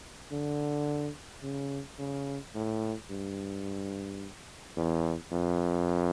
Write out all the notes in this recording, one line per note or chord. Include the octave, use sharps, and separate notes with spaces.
D3
C#3
C#3
A2
G2
E2
F2